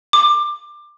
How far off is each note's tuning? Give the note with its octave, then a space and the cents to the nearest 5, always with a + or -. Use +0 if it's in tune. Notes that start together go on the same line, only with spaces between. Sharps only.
D6 +20